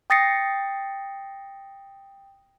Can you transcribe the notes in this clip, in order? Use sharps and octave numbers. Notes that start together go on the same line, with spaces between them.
G5 D#6 A6 A#6 C7 C#7